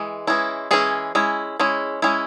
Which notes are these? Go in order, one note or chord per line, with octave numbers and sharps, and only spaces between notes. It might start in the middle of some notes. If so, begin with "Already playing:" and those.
Already playing: E3 G#3
E3 G#3 C#4 E4
E3 G#3 C#4 E4 G#4
G#3 C#4 E4
G#3 C#4 E4
G#3 C#4 E4